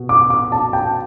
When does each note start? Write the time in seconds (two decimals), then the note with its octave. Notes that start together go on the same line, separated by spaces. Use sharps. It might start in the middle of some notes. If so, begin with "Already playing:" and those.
Already playing: B2
0.09 D6
0.30 D6
0.52 A5
0.73 G5